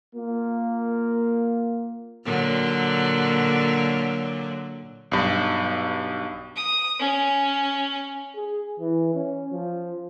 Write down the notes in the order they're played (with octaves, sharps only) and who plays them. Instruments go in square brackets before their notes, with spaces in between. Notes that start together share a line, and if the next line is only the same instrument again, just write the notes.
[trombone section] A#3 F4
[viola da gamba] A#2 D3 F#3
[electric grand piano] B1 G2
[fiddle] D#6
C#4
[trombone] G#4
E3
C#4
F3